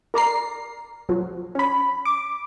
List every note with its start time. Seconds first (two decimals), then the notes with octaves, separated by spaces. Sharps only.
0.14 A#4 D5 A#5 C7
1.09 F3 F#3
1.55 C#4 B5
2.05 D6